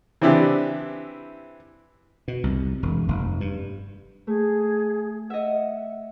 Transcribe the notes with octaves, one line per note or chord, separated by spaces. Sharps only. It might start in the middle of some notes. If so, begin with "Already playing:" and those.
E3 C4 D4 E4 G4
B2
C2
E1
F1
G2
A3 G#4
D#5 E5 F#5